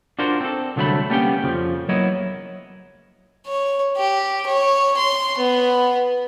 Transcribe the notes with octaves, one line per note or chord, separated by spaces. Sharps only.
D4 F4 F#4 A#4 C5
C4 A4
C2 D3 F#3 A3 A4 B5
G3 A#3 B3 C#4 G4 G5
F2 C#3 F3
F#3 A#3 B3 E4 C#5 D#5
C#5
G4
C#5
C6
B3